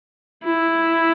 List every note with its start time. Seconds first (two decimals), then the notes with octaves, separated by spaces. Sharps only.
0.44 E4